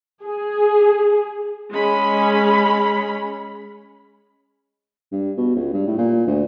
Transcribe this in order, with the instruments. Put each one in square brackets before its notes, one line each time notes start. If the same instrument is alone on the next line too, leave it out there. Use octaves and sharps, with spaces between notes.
[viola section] G#4
G#3 C#4 B5
[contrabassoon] G2
B2
C#2
G2
A2
A#2
D2